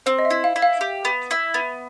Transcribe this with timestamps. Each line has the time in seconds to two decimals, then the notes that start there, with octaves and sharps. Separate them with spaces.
0.06 C4 C5
0.19 D#5
0.25 E5
0.31 E4
0.44 F5
0.56 E4
0.62 F5
0.81 G4
1.05 B3
1.31 E4
1.54 B3